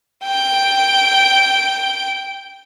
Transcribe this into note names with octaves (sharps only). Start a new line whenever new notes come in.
G5 D7